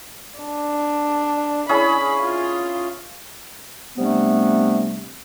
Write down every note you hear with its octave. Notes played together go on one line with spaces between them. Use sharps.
D4
C#4 E4 G#4 B5
F4
C3 G3 A3 B3 C4 D4